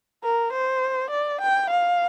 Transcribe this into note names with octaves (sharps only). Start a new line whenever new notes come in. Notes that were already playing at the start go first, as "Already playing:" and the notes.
A#4
C5
D5
G5
F5